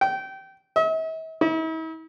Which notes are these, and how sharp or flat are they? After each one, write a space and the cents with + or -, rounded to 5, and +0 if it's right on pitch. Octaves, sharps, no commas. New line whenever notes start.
G5 -25
E5 -45
E4 -45